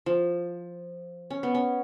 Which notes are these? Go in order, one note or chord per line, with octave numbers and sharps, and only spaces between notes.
F3
C#4
B3
C#4